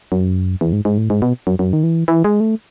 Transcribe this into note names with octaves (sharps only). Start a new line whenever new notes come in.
F#2
E2
G#2
G#2
A2
G#2
B2
F#2
F#2
D#3
E3
E3
G#3
A3